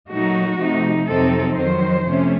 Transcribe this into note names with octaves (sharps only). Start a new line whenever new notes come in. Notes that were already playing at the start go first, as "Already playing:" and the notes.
A#2 F#3 A3 D#4 F#4
C3 F3 A3 D#4
F2 C3 F#3 C4 D#4 A4
F2 D#3 F#3 C5
C3 F3 A3 C#4